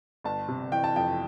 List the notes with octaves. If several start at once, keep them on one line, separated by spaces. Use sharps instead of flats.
G1 A5
C3
E3 G5
A5
F2 G5